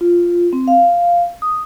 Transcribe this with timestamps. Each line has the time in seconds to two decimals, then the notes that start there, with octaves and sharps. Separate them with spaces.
0.01 F4
0.53 C4
0.68 F5
1.42 D#6